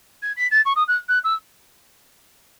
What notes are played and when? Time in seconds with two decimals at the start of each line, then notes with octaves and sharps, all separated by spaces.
0.22 G#6
0.36 B6
0.51 A6
0.65 C#6
0.75 D#6
0.87 F#6
1.08 F#6
1.24 E6